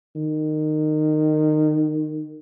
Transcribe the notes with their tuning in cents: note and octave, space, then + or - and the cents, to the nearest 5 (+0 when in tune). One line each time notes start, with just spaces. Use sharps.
D#3 -20